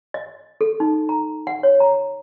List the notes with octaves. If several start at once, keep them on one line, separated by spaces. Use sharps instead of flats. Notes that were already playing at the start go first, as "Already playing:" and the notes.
D#5
A4
D#4
A#5
F#5
C#5
A#5